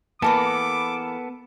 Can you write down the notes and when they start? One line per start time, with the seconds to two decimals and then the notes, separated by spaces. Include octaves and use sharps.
0.22 E3 A#3 B3 A4 B4 A5 D6